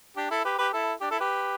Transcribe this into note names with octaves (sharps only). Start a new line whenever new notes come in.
D4 G4
E4 A4
G4 B4
G4 B4
E4 A4
D4 G4
E4 A4
G4 B4